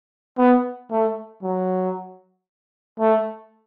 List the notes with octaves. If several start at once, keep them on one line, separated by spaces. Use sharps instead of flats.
B3
A3
F#3
A3